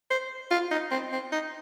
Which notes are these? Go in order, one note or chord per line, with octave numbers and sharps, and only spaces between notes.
C5
F4
D#4
C4
C4
D#4